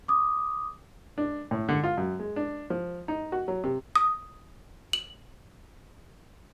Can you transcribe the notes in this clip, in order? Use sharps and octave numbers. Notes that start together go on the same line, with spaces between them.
D6 D#6
D4
A2
D3
F4
F#2
G#3
D4
F3
D#4
F#4
F#3
C3
D#6
F#7